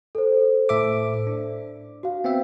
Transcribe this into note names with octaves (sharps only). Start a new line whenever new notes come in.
A4 C5
A2 E5 D6
D4
F#4 F5
B3 C4 E5